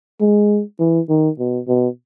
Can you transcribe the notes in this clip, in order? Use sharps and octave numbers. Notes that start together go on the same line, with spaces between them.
G#3
E3
D#3
B2
B2